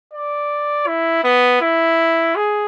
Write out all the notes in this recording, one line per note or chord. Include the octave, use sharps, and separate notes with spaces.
D5
E4
B3
E4
G#4